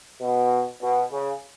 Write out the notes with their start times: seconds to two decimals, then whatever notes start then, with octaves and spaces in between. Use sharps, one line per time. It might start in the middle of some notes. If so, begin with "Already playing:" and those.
0.21 B2
0.81 B2
1.11 C#3